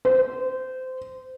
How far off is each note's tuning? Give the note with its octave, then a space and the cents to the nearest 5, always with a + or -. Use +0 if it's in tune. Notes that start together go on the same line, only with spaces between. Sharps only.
C5 -20